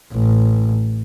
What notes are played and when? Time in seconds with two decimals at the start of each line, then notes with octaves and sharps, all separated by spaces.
0.13 A1